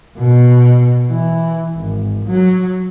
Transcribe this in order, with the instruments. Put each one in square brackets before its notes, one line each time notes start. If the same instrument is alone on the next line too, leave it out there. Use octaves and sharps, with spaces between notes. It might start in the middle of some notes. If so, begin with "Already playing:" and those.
[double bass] B2
E3
G#1
F#3